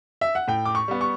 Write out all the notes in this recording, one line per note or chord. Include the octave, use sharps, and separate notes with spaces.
E5
F#5
A2 G5
D6
C#6
G3 B3
C#6